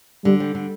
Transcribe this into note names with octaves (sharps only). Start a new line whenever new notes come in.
D3 G3
G3
D3